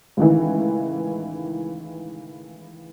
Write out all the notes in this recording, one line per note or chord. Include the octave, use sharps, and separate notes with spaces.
C#2 A2 D#3 E3